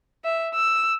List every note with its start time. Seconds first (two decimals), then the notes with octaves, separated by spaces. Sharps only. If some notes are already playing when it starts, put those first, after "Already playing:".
0.25 E5
0.54 E6